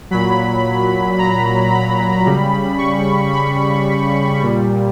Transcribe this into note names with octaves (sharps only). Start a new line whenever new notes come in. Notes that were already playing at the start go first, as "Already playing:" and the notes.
A#2 F#3 B5
A#5
B5
C#3 G3
C#6
B5
A#2 G3